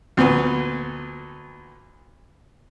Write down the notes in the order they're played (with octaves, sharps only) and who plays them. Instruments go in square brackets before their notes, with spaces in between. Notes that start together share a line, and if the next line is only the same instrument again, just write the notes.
[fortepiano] D2 A#2 B3